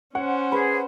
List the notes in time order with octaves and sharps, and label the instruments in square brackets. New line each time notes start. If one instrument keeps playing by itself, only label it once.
[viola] C#4 C5 [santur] C#5 [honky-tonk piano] F#5
[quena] G#4 [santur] B4 B5